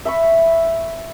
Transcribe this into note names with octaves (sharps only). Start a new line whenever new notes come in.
E5 B5 C#6